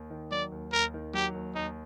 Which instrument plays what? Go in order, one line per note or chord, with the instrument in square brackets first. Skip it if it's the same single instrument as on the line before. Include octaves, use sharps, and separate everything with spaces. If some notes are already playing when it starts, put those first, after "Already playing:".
Already playing: [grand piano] D#2
D#3
[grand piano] F#3 [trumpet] D5
[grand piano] D#2
[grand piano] D#2 [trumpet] A#4
[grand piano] D#3
[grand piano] F#3 [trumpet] G4
[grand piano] D#2
[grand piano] D#2 [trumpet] D#4